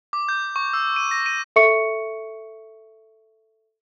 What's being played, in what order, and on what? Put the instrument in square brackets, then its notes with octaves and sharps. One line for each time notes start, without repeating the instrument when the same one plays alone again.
[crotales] D6
G6
C#6
E6
D#7
A#6
D#7
[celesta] A4 E5 C#6 C#7